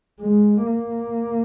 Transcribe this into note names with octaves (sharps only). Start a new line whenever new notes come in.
G#3
A#3